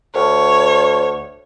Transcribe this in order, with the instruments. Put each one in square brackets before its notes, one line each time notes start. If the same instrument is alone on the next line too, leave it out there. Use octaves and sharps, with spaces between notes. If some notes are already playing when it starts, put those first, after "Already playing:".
[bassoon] D2 [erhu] C#5